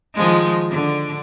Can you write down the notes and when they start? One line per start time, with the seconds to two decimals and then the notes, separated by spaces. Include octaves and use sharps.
0.14 D#3 F3 G#3
0.70 D3